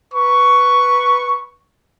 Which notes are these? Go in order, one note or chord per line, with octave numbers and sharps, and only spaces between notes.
B4 C#6